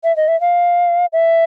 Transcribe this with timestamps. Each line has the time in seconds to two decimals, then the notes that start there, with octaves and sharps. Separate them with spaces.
0.04 E5
0.17 D#5
0.28 E5
0.41 F5
1.13 E5